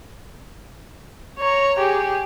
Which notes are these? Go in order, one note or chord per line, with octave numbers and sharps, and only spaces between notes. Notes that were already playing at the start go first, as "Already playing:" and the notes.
C#5 A#5
G4 G#4